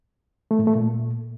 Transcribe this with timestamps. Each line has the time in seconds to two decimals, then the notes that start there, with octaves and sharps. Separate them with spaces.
0.51 A3
0.59 A2
0.67 A3
0.75 A#2